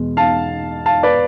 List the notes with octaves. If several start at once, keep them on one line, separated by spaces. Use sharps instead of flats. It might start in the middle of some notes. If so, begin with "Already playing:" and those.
Already playing: E2 B2 G#3
F5 A5
F5 A5
B4 D5